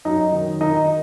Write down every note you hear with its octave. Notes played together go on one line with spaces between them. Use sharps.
F#2 D#4
D#3
D#3 D#4